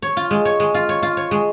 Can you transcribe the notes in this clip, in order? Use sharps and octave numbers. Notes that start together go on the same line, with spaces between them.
C#5
F4
G#3
C#5
G#3
F4
C#5
F4
C#5
G#3